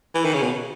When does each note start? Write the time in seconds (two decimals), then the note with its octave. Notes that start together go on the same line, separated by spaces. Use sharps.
0.14 E3
0.24 D#3
0.34 C#3
0.43 B2